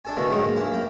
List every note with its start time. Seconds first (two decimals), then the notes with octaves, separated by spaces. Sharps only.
0.05 D4 A4 G#5
0.16 B2 D3 E3 A3 A#3
0.29 G#2 D3 D#3 F#3 G#3 D#4
0.42 G#2 A#3
0.56 D2 E3 E4 F5
0.72 F#2 A#3 G5